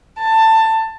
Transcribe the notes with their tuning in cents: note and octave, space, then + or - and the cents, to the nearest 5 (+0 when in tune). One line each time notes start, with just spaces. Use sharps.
A5 +15